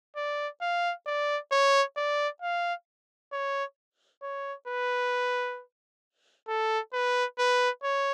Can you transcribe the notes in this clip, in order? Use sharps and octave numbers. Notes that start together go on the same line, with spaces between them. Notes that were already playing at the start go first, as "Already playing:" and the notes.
D5
F5
D5
C#5
D5
F5
C#5
C#5
B4
A4
B4
B4
C#5